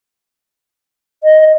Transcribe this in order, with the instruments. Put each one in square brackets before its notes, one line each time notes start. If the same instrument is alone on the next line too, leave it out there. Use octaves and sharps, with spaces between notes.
[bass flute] D#5